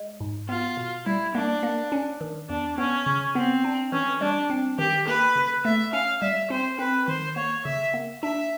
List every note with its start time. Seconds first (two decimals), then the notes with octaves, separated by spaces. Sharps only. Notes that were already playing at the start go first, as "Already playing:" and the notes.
Already playing: G#3
0.21 G#2
0.49 B3 F4
0.77 B2
1.06 G3 E4
1.35 A#3 D4
1.63 A#3
1.92 C#4
2.21 D#3
2.49 E2 D4
2.78 B3 C#4
3.06 C#3
3.35 B3 C4
3.64 D4
3.92 E3 C#4
4.21 G3 D4
4.50 C4
4.78 D#3 G4
5.07 A#3 B4
5.36 C#3
5.64 A3 E5
5.93 C#4 F5
6.22 G3 E5
6.50 C4 C5
6.79 C4 B4
7.08 D#3 C5
7.36 A#3 C#5
7.65 C#3 E5
7.94 A#3
8.23 D4 E5